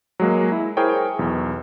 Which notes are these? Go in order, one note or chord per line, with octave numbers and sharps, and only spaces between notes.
F#3 G#3 A#3
E4
E4 G#4 A#4 C5 C#5 G5
B1 E2